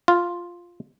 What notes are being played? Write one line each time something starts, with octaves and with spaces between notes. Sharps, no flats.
F4